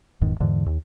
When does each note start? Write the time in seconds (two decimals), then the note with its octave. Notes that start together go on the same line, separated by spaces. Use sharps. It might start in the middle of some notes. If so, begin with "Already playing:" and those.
0.21 F#1 E2 G#2 D#3
0.40 E2 G#2 D3 E3
0.66 D#2